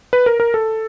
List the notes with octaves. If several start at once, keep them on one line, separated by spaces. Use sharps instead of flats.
B4
A#4
A#4
A4